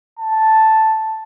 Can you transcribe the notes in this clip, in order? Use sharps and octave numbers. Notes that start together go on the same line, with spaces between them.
A5